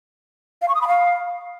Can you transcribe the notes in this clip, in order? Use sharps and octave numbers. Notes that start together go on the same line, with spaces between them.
F5
C#6
D#6
B5
F5